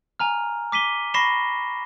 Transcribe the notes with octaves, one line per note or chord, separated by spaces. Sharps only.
G#5 A#5 F6
D6 B6 D#7 G7
B5 C#6 A#6 C7 E7 G7